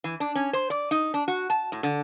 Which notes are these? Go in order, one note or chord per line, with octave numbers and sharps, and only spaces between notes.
E3
D4
C#4
C5
D5
D#4
D4
F#4
A5
A2
D3